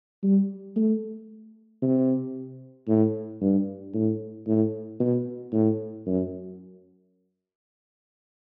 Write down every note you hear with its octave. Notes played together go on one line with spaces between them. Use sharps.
G3
A3
C3
A2
G2
A2
A2
B2
A2
F#2